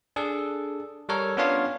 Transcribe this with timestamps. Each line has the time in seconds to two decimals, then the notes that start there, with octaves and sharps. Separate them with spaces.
0.16 D4 G#4 A4
1.09 G3 A4 A#4 C#5
1.37 B3 C#4 D4 F4 C#5 F5